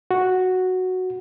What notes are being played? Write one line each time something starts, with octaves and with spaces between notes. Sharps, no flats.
F#4